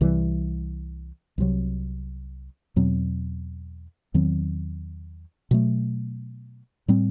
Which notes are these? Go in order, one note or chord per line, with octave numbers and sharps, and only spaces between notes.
C2 C3 E3 G3
C2 C3 F#3
E2 B2 F#3 C4
E2 D#3 F#3 C4
B2 F#3 A3
A2 G3 C4